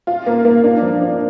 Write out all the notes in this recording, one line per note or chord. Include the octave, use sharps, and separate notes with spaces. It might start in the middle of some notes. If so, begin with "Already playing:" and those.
F4
A#3
A#3
D4
F3
D4